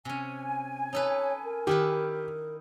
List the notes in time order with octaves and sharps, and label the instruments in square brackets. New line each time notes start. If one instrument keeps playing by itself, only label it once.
[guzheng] C3 C#4 [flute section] G#5
[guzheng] D#4 A4 B4 [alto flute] C#5
[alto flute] A#4
[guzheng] D#3 E4 B4 [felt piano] G4